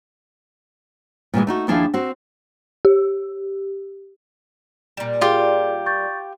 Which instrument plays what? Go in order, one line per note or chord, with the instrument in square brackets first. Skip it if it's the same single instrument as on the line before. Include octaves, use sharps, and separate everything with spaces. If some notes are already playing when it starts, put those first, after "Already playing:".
[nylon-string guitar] A#2 E3 G3 G#3
A3 D#4 F#4
D#2 F3 D4 E4 G#4 F5
C4 F#4
[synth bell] G4
[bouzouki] A#2 G3
[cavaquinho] F4 G4 [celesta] G#4 D5
[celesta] C#6 G6 A6